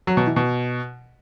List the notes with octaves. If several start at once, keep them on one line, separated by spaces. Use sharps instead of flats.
F#3
B2
E3
B2